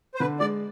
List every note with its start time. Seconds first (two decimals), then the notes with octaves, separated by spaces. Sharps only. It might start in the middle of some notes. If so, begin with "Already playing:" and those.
0.15 C5
0.20 D3 B4
0.40 G#3 D5